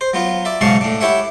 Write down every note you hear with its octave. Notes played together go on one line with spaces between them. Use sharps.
C5
F#3 B3 F4
D5 E5
B1 G#2 C#3 F5 A5 C#6
A2 D4
E4 G4 C#5 E5 F#5